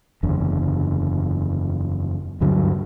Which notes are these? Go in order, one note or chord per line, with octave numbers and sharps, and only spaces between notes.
F#1 E2 D3
D2 G2 D3 F#3